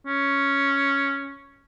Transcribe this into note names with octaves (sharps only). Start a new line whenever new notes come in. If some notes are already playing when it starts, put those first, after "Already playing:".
C#4